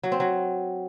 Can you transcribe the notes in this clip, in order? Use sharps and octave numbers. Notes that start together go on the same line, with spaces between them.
F#3
C4
F#3